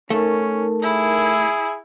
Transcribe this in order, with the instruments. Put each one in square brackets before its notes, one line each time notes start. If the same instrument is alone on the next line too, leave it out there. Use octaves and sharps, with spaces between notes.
[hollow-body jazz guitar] A3 [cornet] C#4 [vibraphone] D#4 A#4 A5
[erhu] E4 [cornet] G#4